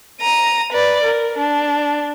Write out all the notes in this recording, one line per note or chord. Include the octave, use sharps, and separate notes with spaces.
A#5 D#7
B4 D5
A#4
D4